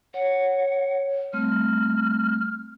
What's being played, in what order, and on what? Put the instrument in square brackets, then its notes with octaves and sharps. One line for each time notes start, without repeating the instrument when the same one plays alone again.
[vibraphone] C#5 [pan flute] F#5
[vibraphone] G3 A3 C4 [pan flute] F6